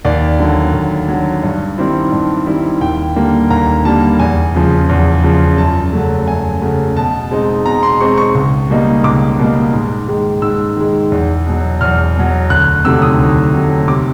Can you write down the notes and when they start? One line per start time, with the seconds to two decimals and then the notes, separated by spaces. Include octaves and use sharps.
0.05 D#2 D5
0.39 D3 F#3
0.74 D#2
1.08 D3 F#3
1.43 G2
1.78 D#3 G3 C4 E4
2.12 G2
2.47 D#3 G3 C4 E4
2.81 D#2 G5
3.16 D3 G3 A#3
3.50 D#2 A#5
3.85 D3 G3 A#3 A5
4.20 E2 G#5
4.55 C#3 F3
4.89 E2
5.23 C#3 F3
5.58 F#2 A5
5.93 C#3 F#3 A3
6.28 F#2 G#5
6.62 C#3 F#3 A3
6.97 B2 A5
7.31 G#3 C4 D#4
7.66 B2 A#5
7.83 C6
8.00 G#3 C4 D#4 C#6
8.18 C#6
8.35 C#2
8.70 B2 G3 A#3 D#4
9.04 C#2 D6
9.39 B2 G3 A#3 D#4
9.73 G#2
10.08 D#3 G#3
10.42 G#2 E6
10.77 D#3 G#3
11.12 E2
11.46 B2 F#3
11.81 E2 F6
12.16 B2 F#3
12.50 D2 F#6
12.85 C3 D#3 F#3 A3 E6
13.02 D#6
13.19 D2
13.54 C3 D#3 F#3 A3
13.88 C3 D6